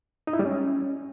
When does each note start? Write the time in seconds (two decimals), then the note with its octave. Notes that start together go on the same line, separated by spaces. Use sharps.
0.27 D#4
0.33 E4
0.39 G3
0.45 C#4